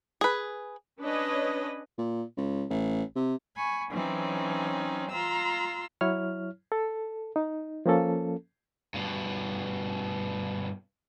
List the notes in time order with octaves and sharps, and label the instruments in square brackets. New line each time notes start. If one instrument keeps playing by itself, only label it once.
[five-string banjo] G#4 B4
[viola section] C#4 D4 B4 C#5 D#5
[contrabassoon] A#2
C#2
A1
C3
[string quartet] G#5 B5 C#6
E3 F#3 C4 C#4 D#4
F4 A#5 C6 E6
[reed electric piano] F#3 E4 C#5 F6
A4
D#4
F3 A#3 C#4 A4
[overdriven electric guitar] G2 B2